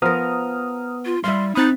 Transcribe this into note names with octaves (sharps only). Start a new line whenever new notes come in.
F3 B3 A#4 A#5 D#6 F6
F4
G3 E4 F5 C6
C4 D#4 B5 D#6 F#6 A6